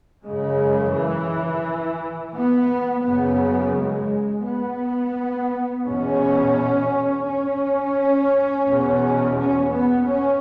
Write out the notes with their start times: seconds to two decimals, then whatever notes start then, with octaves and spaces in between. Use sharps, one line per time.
0.24 F#2 C#3 G#3
0.95 E3
2.36 B3
3.06 F#2 C#3 B3
3.76 G#3
4.46 B3
5.87 E2 B2 C#4
7.28 C#4
8.68 E2 B2
9.39 C#4
9.74 B3
10.09 C#4